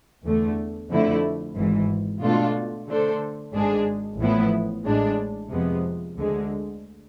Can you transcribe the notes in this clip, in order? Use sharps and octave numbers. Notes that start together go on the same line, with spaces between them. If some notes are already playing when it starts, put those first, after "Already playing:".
E2 D3 A3
F2 D3 A3 E4
G#1 G#2 E3
B2 A3 D4 F4 A4
D3 A3 D4 A4 C5
G#1 G#2 G#3 D4 G#4
A1 A2 F3 B3 E4
A1 A2 G#3 D4
F2 C3 F3 G#3 B3
D2 D3 G#3